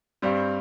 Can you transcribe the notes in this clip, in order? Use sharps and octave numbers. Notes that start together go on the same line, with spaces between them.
G2 G3 C4